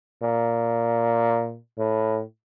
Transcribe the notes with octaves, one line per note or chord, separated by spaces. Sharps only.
A#2
A2